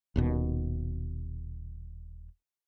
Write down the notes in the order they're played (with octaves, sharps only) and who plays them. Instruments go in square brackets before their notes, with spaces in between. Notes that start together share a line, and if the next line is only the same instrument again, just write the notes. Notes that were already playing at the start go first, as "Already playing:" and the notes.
[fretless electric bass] D#1 D#2 B2